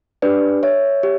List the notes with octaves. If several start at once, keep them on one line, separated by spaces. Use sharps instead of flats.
D4 G4 B4 D5
C#5 E5
G4